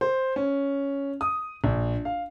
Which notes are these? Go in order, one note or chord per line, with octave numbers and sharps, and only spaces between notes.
C5
C#4
D#6
A#1
F5